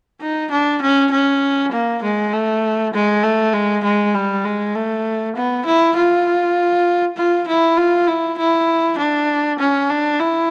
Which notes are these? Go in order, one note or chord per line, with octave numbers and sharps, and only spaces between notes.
D#4
D4
C#4
C#4
A#3
G#3
A3
G#3
A3
G#3
G#3
G3
G#3
A3
B3
E4
F4
F4
E4
F4
E4
E4
D4
C#4
D4
E4